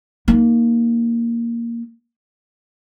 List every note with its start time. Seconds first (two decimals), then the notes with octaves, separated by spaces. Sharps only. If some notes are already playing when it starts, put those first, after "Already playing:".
0.28 A#3 D#4